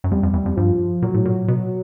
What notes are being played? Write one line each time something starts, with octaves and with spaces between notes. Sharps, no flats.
F#2
F2 G3
F2
E2
F2
G2 F3
A#2 F#3
A2
A#2
B2